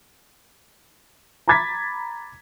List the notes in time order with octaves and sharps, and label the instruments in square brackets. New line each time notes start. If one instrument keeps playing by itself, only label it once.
[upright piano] A#5 B5 D6 G#6 A6 B6